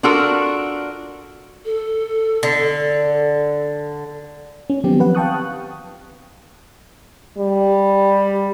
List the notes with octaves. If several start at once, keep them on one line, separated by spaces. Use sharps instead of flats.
D4 F4 F#4 A4 A#4
A4
D3
C#4
D#3 F3 F#3 B3 C4 G4
B4 F#5
F5 G5 A5 C#6 D#6 F#6
G3